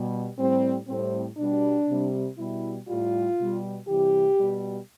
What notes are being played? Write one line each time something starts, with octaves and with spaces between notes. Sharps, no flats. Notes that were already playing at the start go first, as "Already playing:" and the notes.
Already playing: B2 G3
A2 G3 C4
A2 G3 C4
B2 G3 D4
C3 G3
B2 G3 E4
A2 G3 F4
B2 G3
C3 E3 G3 G4
B2 G3